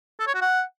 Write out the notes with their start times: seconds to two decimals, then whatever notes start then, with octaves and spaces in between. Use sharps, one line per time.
0.20 A4
0.27 C#5
0.34 F#4
0.42 F#5